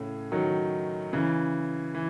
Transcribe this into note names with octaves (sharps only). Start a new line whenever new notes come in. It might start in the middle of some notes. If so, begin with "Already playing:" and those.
Already playing: A2 C#3
D#3 F#3
C#3 E3
E3